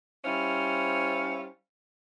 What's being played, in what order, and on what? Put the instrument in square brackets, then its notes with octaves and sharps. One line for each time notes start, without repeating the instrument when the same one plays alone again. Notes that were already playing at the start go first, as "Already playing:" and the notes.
[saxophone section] G3 C#4 E4 C5 F5